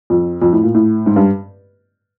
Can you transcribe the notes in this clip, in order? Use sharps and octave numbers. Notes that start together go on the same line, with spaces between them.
F2
F2
A2
A#2
A2
G#2
G2